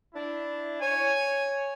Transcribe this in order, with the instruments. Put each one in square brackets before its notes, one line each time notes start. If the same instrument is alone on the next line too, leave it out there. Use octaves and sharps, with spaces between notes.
[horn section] D4 E4
[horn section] C#5 [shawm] G#5